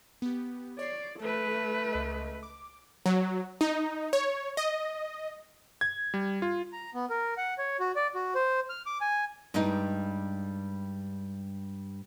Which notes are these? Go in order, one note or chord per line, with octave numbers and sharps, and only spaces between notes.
B3 G4
C#5 D5 C7
A3 A4 B4
C#2 D#5
D6
F#3
D#4
C#5
D#5
G#6
G3
F4
A#5
B3
A#4
F#5
C#5
F#4
D5
F#4
C5
F6
D6
G#5
G2 G3 G#3 D4 D#4